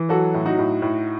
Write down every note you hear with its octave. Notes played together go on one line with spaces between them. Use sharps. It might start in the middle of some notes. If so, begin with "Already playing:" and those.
Already playing: E3
F#3 F#4 A4
A2
D#4 F#4
A2
A2